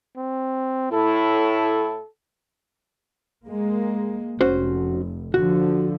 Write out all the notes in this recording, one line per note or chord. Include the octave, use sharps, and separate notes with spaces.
C4
A2 E4 A4
G#3 A#3
F1 C#4 F#4 C5
D3 F3 F#4